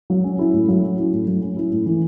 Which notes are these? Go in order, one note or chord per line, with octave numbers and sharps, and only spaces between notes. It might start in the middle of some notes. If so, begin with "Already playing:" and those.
F#3
C#4
E4
A2
F#3
C#4
E4
A2
F#3
C#4
E4
A2
E3